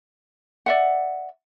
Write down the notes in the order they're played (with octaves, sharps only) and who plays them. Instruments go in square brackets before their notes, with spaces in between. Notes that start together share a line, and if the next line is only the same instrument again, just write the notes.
[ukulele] D5 E5 F#5